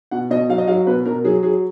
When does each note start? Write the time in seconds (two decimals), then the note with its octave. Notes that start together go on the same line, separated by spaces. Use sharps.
0.11 B2 F#5
0.30 B2 D#5
0.49 F#3 F5
0.58 D#5
0.67 F#3 F5
0.87 B2 B4
1.06 B2 A#4
1.24 F#3 G#4
1.42 F#3 G#4